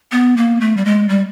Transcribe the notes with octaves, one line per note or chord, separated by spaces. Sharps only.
B3
A#3
A3
G3
G#3
G3